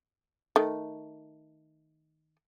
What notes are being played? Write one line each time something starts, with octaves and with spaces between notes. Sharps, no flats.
D#3 A3